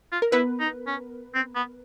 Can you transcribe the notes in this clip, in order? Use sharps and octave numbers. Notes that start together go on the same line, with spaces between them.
F4
A#4
B3 E4 B4
D#4
C#4
C4
B3